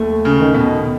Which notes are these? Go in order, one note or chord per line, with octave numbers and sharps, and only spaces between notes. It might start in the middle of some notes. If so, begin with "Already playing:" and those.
Already playing: D#2 A3
C#3
D#3
B2